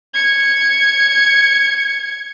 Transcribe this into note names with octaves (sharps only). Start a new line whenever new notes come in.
G#6 C#7